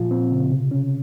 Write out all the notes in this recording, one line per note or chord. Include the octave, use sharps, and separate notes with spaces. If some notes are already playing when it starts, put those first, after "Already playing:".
Already playing: A#2 F3 F4
C4
C#3
C3
C#4